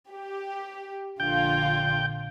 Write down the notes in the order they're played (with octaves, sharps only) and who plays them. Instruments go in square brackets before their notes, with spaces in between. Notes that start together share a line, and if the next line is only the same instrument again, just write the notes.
[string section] G4
[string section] A#1 D3 F4 [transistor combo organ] G5